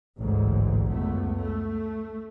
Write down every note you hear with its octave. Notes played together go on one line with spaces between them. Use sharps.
A1 D2 G#2
C#2 F#2 A3 B3
A3